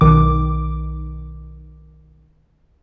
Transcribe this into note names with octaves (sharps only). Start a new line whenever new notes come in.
B1 D#3 D6